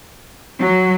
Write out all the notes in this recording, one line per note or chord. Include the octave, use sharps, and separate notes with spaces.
F#3